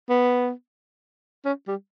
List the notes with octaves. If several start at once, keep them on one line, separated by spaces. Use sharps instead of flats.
B3
C#4
G3